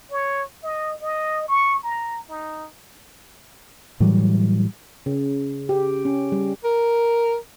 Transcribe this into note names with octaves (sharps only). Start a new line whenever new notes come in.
C#5
D#5
D#5
C#6
A#5
D#4
A2 E3 F#3 G3
C#3
G4
C#4
G3
A#4